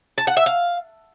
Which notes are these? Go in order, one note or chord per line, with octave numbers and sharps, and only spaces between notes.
A5
F#5
E5
F5